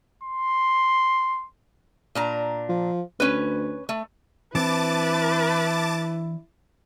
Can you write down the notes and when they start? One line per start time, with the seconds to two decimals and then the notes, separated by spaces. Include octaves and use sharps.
0.23 C6
2.15 A#2 D4 A#5
2.69 F3
3.20 D2 C#4 B4
3.89 A3
4.55 E3 C4 D4 E4 B4 A5 D6 A6